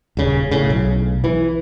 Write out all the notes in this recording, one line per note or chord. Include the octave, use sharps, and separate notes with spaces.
D#1 C#3
A2 C#3
B1
E3